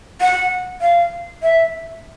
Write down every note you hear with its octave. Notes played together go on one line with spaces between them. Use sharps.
F#5
F5
E5